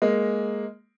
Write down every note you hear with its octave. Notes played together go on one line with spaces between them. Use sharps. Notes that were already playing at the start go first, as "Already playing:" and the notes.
G#3 A#3